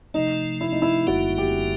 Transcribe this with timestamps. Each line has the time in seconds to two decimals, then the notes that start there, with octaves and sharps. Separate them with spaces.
0.14 C3 F3 A3 D#4
0.61 E4
0.72 D#4
0.82 E4
1.07 F#1 F#2 D3 G3 A#3 F#4
1.38 G4